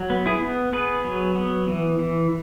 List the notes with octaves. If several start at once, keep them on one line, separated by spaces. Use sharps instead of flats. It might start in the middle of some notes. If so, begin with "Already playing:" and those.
Already playing: F#3
B3
E4 G#4
B3
B3 G#4 B4
F#3
B3
E3
E3